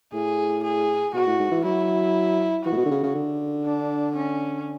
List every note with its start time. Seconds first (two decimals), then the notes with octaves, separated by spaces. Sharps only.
0.13 A2 G#4
0.63 G#4
1.14 B2 F#4
1.27 A2
1.39 G#2
1.51 E3
1.64 F#3 E4
2.65 E3 F#4
2.72 A2
2.77 B2
2.86 D3
2.91 C#3
3.03 C#3
3.15 D3
3.65 D4
4.16 C#4